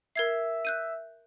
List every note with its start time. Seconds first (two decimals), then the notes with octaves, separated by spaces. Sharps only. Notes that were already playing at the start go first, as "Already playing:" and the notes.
0.16 A#4 E5 G#6 C7
0.65 F#6 G6 D#7